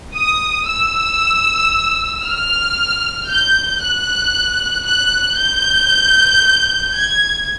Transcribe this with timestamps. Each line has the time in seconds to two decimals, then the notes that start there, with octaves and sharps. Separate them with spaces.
0.16 D#6
0.69 E6
2.25 F6
3.29 G6
3.82 F#6
4.85 F#6
5.37 G6
6.94 G#6